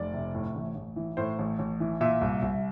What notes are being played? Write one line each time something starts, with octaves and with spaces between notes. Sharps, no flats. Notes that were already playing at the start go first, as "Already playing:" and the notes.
Already playing: F1 D5
C3
A2
A1
A1
E3
A2 C5
A1
A1
E3
A#2 E5
C2
C2